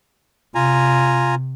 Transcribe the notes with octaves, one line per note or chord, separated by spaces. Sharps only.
C3 F4 G#5 A#5